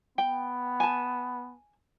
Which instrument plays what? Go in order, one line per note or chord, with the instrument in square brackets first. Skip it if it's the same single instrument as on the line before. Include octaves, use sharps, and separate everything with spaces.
[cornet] B3 [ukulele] G5
[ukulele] G#5 A5